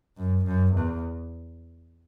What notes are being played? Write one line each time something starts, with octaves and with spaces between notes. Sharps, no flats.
F#2
F#2
E2